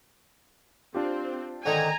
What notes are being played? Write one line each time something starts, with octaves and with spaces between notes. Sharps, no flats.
C4 D4 F4 G4
G#2 D3 D#3 G#5 A#5